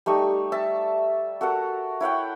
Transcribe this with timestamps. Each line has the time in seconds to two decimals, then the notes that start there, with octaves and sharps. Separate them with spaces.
0.06 G3 A3 D#4 C#6
0.52 E5 A5
1.41 F#4 A4 A#4 F#5
2.00 E4 C#5 F#5 G5